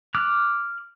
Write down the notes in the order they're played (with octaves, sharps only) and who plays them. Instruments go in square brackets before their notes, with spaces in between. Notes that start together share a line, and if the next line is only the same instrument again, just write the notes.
[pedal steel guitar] D6 F6 F#6